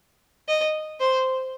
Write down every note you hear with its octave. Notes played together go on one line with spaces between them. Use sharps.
D#5
C5